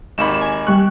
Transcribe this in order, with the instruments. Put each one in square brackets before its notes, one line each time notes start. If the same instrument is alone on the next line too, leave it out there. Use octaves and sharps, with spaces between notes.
[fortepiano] G#1 D#2 B5 [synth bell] E7
[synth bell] G#5
[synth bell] G3 F#6 [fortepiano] C#6